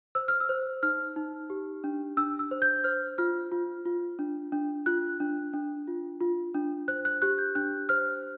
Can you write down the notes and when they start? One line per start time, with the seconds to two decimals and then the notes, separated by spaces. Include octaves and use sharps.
0.15 C5 E6
0.28 F6
0.40 E6
0.49 C5
0.83 D#4 F6
1.16 D#4
1.50 G4
1.84 D4
2.17 D4 E6
2.39 E6
2.51 C5
2.62 G6
2.84 C5 F6
3.18 F4 F6
3.52 F4
3.85 F4
4.19 D4
4.52 D4
4.86 F4 F#6
5.20 D4
5.53 D4
5.88 F4
6.21 F4
6.54 D4
6.88 C5 F#6
7.05 F#6
7.22 G4 F#6
7.38 G6
7.55 D4 F#6
7.89 C5 F6